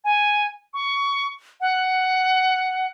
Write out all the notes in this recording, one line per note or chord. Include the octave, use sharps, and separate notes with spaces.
G#5
C#6
F#5